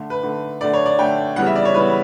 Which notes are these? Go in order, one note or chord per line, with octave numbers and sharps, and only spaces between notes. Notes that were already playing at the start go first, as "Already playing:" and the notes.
Already playing: D3 A3
B4
D3 A3
D3 A3 D5
C#5
D5
D3 A3 G5
C#3 E3 G3 B3 F#5
E5
D5
C#5
C#3 E3 G3 B3 B4